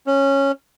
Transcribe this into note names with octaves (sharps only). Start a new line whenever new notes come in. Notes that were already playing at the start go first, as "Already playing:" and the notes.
C#4